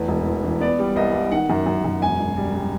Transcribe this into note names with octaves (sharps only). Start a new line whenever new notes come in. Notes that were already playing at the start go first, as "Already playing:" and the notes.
Already playing: F1 E2
E1
E2
E3
B3 D5
G3
C2 D#5
C2
D#3 F#5
F#2
F#2
F#2
E1 G#5
E1
G3
G3